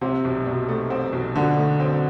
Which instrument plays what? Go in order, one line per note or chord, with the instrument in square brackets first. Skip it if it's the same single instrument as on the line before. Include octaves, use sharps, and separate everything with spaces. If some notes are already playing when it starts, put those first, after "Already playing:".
[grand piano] C3 [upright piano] C4
[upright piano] B1
B2
A3
C4
B1
[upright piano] B2 [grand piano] D3
[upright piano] A3
C4